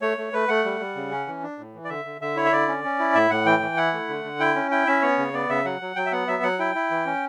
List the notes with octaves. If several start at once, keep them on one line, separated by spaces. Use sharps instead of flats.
A3 C#5
A3
A3 B4
A3 F#5
G3
G3
C#3
C#4
E3
D4
A2
E3
D5
D3 E5
D3
D3 E5
E4 C#5
E5
D3 D5
C#4
C#4
E4
A2 E5
A2 F#5
E3 G5
E3
E4 F#5
A3
D3
D3
E4 G5
C#4
E4 G5
C#4 E5
B3 C#5
C#3
B3 D5
C#3 E5
F#3 F#5
F#3
F#3 G5
E5
B3 F#5
F#3 E5
F#3 F#5
E4 G5
E4
E3
C#4